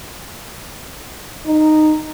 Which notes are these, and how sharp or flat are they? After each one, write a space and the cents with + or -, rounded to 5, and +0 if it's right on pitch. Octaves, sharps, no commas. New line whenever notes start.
D#4 -10